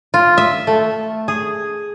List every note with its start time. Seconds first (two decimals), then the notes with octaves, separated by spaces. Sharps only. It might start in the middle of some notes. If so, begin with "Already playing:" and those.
0.14 F4
0.38 E5
0.67 A3
1.28 G#4